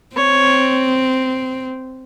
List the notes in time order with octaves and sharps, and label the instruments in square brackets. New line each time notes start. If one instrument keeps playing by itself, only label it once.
[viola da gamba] C4 [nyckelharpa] C#5